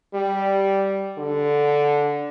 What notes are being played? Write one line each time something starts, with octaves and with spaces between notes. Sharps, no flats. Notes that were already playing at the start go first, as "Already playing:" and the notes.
G3
D3